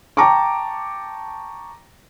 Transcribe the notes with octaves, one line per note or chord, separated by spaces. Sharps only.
G5 A5 A#5 C#6 D6